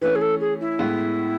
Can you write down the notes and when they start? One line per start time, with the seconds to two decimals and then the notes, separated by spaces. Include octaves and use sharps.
0.01 E3 A3 C#4 B4
0.15 G#4
0.21 A4
0.40 G#4
0.60 E4
0.79 A2 G#3 B3